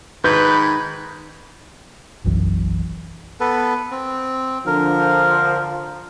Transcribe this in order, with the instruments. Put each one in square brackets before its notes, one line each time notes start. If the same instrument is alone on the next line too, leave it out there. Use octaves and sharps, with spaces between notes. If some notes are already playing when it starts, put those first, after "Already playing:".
[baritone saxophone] G#2 [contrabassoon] D#3 [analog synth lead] B4 [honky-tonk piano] G6
[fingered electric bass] F#1 B1 F#2 E3
[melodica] B3 A4 B4
C4
[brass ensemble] D3 F3 [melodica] A#4